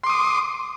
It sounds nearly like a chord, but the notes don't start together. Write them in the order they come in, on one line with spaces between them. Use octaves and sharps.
C6 D6 D#6